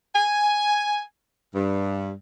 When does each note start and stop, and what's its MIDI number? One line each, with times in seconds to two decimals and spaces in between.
0.16 1.02 80
1.54 2.11 43